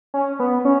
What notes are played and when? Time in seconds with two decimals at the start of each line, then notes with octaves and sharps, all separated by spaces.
0.14 C#4
0.40 B3
0.65 C#4